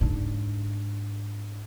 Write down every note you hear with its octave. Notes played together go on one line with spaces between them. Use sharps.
G#2 D4